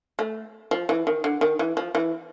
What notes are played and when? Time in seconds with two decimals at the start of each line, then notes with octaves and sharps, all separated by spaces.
0.19 A3
0.71 F3
0.89 E3
1.07 D#3
1.24 D3
1.41 D#3
1.59 E3
1.77 F3
1.95 E3